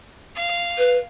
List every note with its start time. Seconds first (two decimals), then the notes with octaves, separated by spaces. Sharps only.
0.35 F5
0.78 B4